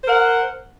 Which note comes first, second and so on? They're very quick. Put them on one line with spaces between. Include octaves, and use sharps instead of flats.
C5 A#4 F#5